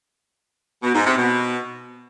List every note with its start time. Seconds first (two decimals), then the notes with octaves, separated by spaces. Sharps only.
0.83 B2
0.94 G#2
1.06 C3
1.18 B2